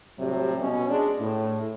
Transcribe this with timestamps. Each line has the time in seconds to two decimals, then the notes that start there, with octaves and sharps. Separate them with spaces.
0.18 A2 C3 F#3 G3
0.59 B2 C#4
0.89 G#3 D4
1.20 A2